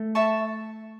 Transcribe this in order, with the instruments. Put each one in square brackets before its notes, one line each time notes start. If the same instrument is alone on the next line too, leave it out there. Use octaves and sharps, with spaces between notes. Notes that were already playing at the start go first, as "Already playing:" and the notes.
Already playing: [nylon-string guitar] A3
[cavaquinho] E5 A5 C#6